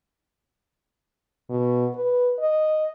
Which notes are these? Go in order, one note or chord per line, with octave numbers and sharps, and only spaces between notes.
B2
B4
D#5